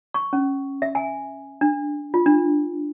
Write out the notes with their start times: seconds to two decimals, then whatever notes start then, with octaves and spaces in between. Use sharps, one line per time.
0.14 C#6
0.33 C#4
0.82 E5
0.95 G#5
1.61 D4
2.14 F4
2.26 D4